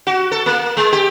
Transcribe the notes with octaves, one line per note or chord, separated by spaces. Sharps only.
F#4
A4
A#3
G#3
G4